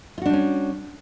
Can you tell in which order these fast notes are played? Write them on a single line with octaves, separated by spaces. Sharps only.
F4 F#4 D4 G3 C#4